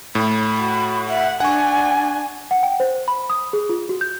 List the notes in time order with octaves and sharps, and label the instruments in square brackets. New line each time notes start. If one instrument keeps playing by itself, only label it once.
[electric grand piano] A2 [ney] B5
[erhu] F#4
[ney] E5 [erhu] F#5
[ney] D4 [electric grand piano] F#5 C#6 [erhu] G#5
[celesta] F#5
G5
C5
B5
D#6
G#4
F4
F#4
G6